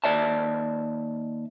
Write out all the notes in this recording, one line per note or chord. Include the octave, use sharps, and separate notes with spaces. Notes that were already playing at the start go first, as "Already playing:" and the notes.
D#2 D5 E5 A5